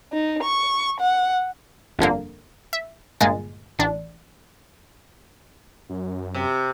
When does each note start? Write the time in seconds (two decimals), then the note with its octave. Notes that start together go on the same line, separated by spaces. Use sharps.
0.12 D#4
0.43 C#6
1.00 F#5
1.99 G1 F2 D3 A#3
2.73 E5
3.20 G1 A#2 G#3 A6
3.79 A1 D4
5.89 F#2
6.34 C3